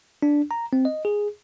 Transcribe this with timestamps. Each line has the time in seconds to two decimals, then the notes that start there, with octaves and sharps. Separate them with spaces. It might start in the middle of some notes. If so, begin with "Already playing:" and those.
0.22 D4
0.51 A#5
0.73 C4
0.85 D#5
1.05 G#4